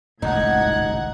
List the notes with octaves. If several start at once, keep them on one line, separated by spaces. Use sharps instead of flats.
D#1 G#1 C#2 A2 D#4 F#5 G#6